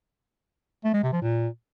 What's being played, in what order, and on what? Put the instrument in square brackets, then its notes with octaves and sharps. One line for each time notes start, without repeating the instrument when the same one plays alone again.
[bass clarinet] A3
G#3
C3
F3
A#2